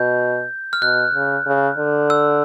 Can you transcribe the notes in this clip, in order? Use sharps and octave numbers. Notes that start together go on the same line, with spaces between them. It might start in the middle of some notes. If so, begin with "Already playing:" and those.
Already playing: B2 G6
F6
B2 F#6
C#3
C#3
D3
E6